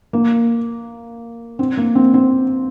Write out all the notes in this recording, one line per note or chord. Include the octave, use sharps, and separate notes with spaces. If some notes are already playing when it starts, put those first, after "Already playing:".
A#3
C4
A#3
C4
C4